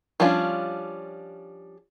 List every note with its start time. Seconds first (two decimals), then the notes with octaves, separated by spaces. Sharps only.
0.20 F3 G3 C#4 D4 F4